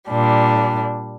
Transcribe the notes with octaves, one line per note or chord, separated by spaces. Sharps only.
A#2 G3 D4